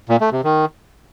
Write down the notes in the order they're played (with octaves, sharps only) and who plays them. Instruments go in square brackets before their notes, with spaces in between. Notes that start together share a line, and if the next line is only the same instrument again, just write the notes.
[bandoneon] A#2
A3
C3
D#3